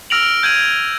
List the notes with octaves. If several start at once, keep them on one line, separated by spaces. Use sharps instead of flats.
E6 F6 A#6 D7 F7 F#7
G6 G#6 D#7 F#7